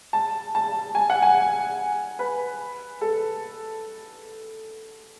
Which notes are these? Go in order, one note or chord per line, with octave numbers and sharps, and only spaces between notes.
A5
A5
G#5
F#5
G#5
B4
A4